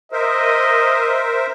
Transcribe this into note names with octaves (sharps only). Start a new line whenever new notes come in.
A#4 C5 D#5 E5